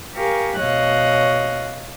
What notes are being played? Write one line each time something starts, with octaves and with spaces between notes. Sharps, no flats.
G4 A#4 F5 G#5 C#6
B2 C#5 D#5 F5 F#6